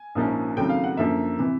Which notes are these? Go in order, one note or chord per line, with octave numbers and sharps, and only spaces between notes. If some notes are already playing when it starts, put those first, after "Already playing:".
Already playing: G#5
A#1 G#2 F3 A#3 C#4
D#2 C#3 F#3 A3 C4 G5
F5
F#5
F#2 D3 F3 A#3 E5
C3 E3